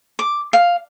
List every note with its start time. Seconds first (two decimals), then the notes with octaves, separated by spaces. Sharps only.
0.19 D6
0.53 F5